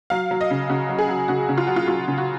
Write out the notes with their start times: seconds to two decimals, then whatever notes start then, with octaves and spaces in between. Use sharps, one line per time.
0.10 F#3 F5
0.31 F#3
0.41 D#5
0.51 C#3
0.69 C#3 F#4
0.89 F#3
0.99 G#4
1.09 F#3
1.28 C#3 F#4
1.49 C#3
1.58 F4
1.67 F#3 F#4
1.76 F4
1.88 F#3 F4
2.08 C#3
2.18 F#4